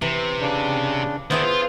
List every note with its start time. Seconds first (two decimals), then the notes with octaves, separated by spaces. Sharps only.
0.02 C3 E3
0.41 C#3 D4
1.31 D#3 B3 D4 E4 G#4 C5
1.44 F4